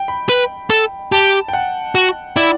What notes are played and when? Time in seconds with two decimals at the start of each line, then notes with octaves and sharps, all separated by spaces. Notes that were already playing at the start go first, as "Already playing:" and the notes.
Already playing: G5
0.08 B5
0.29 B4
0.70 A4
1.12 G4 A5
1.48 G5
1.53 F#5
1.95 F#4
2.36 E4 D5